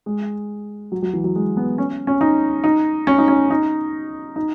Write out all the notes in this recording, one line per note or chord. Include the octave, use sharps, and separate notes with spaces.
G#3
F#3
F#3
E3
F#3
G#3
B3
C#4
C#4
D#4
D#4
C#4
D#4
C#4
D#4
D#4